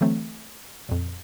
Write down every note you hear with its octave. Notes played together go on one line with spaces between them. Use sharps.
D3 E3 F#3 A3 C4
F2 A#2